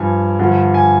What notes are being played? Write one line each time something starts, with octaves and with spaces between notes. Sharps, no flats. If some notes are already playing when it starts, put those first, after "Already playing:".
Already playing: G2 F3 G#5
G2 D3 F3
G#5